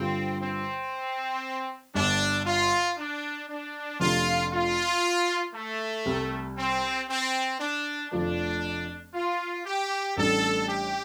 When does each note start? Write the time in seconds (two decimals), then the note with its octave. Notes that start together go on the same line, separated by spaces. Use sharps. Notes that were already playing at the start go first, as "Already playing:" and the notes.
Already playing: G2 D3 G3 C4 F4
0.40 C4
1.94 G1 G2 G3 D4
2.46 F4
2.97 D4
3.49 D4
4.00 F1 F2 C3 A3 D4 F4
4.52 F4
5.54 A3
6.06 C2 C3 G3
6.57 C4
7.09 C4
7.60 D4
8.11 F1 F2 F3 A3 D4
9.14 F4
9.65 G4
10.17 A1 A2 G3 D4 A4
10.68 G4